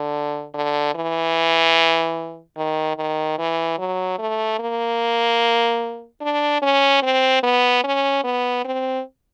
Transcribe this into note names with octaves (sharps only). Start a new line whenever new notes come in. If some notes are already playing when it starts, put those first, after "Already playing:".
Already playing: D3
D3
E3
D#3
D#3
E3
F#3
A3
A#3
D4
C#4
C4
B3
C#4
B3
C4